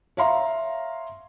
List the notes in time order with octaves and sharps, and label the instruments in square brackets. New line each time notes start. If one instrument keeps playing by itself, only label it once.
[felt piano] C#5 E5 F5 A#5 C6